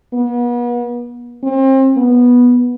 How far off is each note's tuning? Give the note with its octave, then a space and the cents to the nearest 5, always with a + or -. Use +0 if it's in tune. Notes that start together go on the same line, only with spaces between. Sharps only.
B3 -40
C4 +35
B3 -10